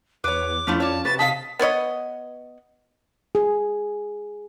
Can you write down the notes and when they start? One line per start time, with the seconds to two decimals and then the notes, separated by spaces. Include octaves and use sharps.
0.24 E2 B4 C#5 D6
0.67 F2 F3 A3 C#4 E4 F4
0.80 C#5 D5 A5
1.05 C3 F#4 B4 A6
1.19 G#4 D#5 F5 A5 B6
1.59 B3 B4 C#5 D#5
3.35 G#4